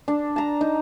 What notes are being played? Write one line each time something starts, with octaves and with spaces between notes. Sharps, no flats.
D4
A5 A#5
D#4